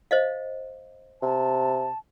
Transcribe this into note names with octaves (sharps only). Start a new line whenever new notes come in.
C5 D#5 F5
C3 A5